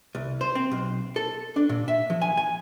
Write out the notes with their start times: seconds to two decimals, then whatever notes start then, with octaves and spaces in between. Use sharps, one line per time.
0.15 C2
0.41 C5
0.55 C4
0.71 B1
1.16 A4
1.56 D4
1.69 A#2
1.88 E5
2.10 F3
2.22 G#5
2.37 G#5